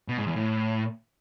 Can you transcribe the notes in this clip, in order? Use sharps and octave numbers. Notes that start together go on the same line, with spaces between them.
B2
G#2
E2
A2